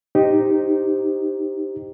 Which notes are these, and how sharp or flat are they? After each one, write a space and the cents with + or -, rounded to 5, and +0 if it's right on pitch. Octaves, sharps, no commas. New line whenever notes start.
D#4 +0 G4 +0 C5 +0